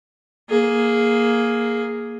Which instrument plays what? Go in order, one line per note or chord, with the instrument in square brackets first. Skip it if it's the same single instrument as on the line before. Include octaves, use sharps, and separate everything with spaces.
[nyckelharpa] A#3 G#4